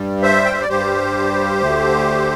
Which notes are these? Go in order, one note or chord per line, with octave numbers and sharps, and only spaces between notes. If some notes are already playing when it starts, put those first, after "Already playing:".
Already playing: G2 G3
C5 E5
G5
E5
D5
G2 G3 G4 C5
D2 D3 A3